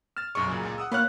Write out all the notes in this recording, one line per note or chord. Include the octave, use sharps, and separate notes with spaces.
F6 A6 E7
B1 F#2 D#4 G#4 C#6
A#2 C#3 F#3
C#2 A#2
F#5 D#6 E6
A#3 F4 C#5 F#5 B5 F6 F#6